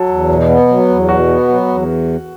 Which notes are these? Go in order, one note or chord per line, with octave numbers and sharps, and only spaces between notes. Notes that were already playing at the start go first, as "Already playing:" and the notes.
Already playing: F#3 A4
E2
B2
B3
F#3
E2
B2 F#4
B3
F#3
E2